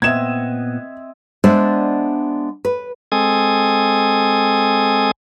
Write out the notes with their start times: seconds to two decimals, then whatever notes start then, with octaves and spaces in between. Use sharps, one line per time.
0.02 A#2 B3 C4 D#5 E5 G#6 E7
1.44 G#3 B3 D4 C5 D5 E5
2.65 B4
3.12 G#3 C4 A4 G#5 D#6